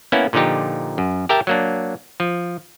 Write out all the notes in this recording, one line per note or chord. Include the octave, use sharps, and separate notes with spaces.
A#3 B3 C#4 E4
A#2 D3 F3 D#4 G4
F#2
G4 A#4 E5 G5 A5
F#3 A#3 D4
F3